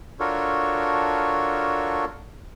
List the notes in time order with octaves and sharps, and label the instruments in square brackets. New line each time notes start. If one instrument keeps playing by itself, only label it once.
[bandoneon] D4 F4 F#4 A4 A#4 C#5